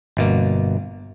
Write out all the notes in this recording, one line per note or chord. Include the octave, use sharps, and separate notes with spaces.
G1 B2 A#3